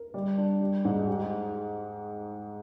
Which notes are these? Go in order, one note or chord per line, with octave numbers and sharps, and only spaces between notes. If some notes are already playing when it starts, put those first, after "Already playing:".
Already playing: A#4
G3
D4
G3
G#2
G4